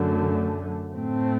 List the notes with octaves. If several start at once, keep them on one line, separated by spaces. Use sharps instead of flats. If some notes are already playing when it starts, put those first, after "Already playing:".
Already playing: F#2 D3 A3
A2 A3 C4